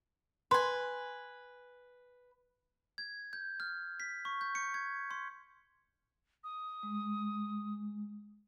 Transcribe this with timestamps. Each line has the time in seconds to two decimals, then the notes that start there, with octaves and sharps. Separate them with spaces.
0.51 B4 G#5 C6
2.98 G#6
3.33 G6
3.60 F6
4.00 B6
4.25 C#6
4.41 G6
4.55 C#7
4.74 G#6
5.11 C6
6.44 D#6
6.83 G#3